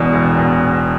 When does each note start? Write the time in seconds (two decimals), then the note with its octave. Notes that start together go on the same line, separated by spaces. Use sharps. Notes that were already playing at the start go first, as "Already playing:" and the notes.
Already playing: E1 E2 B2
0.13 E1
0.38 B2